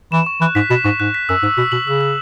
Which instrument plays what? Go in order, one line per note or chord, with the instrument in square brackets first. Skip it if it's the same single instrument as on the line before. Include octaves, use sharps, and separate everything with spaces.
[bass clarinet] E3 [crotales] E7
[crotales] C#6
[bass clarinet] E3 [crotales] F#6
[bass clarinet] G#2 [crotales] B6
[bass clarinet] B2 [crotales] E7
[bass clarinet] G#2 [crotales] C#6
[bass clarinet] G#2 [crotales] F#6
[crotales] B6
[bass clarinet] F#2 [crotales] E6
[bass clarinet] G#2 [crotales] E6
[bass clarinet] B2 [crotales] B6
[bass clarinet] B2 [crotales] F#7
[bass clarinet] C#3 [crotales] E6
[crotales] E6